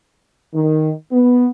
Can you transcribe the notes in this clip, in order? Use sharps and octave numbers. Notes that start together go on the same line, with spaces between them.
D#3
B3